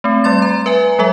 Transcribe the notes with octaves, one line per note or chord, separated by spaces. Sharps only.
A3 C4
G3 D5 C6 A6
A#5
B4 E5 G#5
F#3 G#3 A4 E5